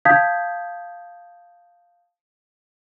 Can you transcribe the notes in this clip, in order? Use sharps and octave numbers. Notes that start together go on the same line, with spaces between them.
F5 A5 D#6 G6 G#6 B6